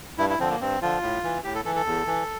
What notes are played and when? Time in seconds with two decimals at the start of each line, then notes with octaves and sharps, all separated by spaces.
0.18 G2 E4
0.30 E4
0.39 D3 F3 C4
0.51 A#3
0.60 G2 C4
0.82 D3 F3 F4
1.02 A2
1.24 E3
1.44 A2 G4
1.55 A4
1.65 E3 A4
1.76 A4
1.86 E2
2.07 E3